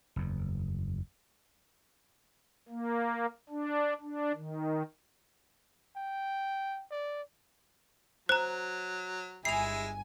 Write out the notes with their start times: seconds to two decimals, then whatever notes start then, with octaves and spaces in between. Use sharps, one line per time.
0.16 F#1 E2
2.69 A#3
3.49 D4
4.01 D4
4.34 D#3
5.96 G5
6.91 D5
8.29 F#3 C5 A#5 F#6
9.45 G1 G#3 E4 G#4 G#5 C7 F7